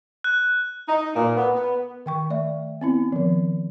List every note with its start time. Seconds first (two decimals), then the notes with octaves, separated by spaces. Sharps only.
0.24 F#6
0.88 D#4
1.15 A#2
1.37 B3
1.55 B3
2.06 D#3 G5 C#6
2.30 A3 D5 E5
2.81 B3 C4 E4
3.12 D#3 F3